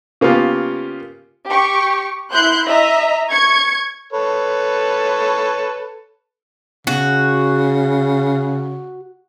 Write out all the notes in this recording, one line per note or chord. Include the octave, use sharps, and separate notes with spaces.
C#3 A#3 B3 F4 G4
G4 C#6
E4 C6 F#6 G6
D#5 E5 A#5 B6
C#6 G#6 C#7
A4 B4 C#5
C#3 F#4